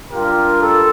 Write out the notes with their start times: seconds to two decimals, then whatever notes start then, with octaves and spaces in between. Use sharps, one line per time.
0.11 G3 D4 F4 G4 A#4
0.62 A4